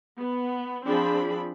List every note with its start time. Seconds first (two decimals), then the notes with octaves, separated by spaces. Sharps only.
0.17 B3
0.85 F3 C4 D4 G#4 B5